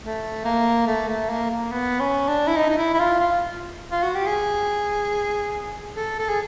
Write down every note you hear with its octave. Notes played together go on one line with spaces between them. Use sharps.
A3
A#3
A3
A3
A#3
A#3
B3
C#4
D4
E4
D#4
D#4
E4
E4
F4
F4
F4
F#4
G4
G#4
A4
A4
G#4